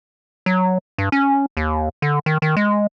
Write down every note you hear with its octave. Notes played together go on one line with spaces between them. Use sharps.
F#3
G2
C#4
D#2
D3
D#3
D#3
G#3